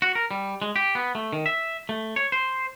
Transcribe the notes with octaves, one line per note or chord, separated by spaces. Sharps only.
F#4
A#4
G3
G#3
G4
B3
A3
D#3
E5
A3
C#5
C5